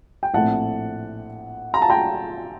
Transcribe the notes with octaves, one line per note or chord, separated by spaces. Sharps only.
G5
A#1 A2 A3 C4 F#5 A5
A#5
A5
G5 A#5